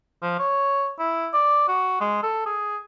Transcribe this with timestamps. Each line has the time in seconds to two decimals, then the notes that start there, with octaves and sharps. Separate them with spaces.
0.22 F3
0.39 C#5
0.99 E4
1.33 D5
1.68 F#4
2.01 G#3
2.23 A4
2.46 G#4